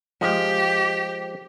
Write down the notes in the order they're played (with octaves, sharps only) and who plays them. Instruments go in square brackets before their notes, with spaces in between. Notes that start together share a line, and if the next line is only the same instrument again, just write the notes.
[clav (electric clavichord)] F3 G#3 [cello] G4